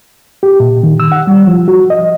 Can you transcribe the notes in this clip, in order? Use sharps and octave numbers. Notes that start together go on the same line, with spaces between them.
G4
A#2
D#3
E6
F#5
G3
F3
F#4
D#5